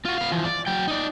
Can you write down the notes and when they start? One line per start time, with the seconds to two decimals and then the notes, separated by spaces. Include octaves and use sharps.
0.05 F4 F#4
0.18 B3 F5
0.32 E3 F3
0.45 D5
0.67 F#3 G5
0.88 D#4 D5